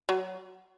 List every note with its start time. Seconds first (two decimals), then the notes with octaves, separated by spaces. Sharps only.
0.09 F#3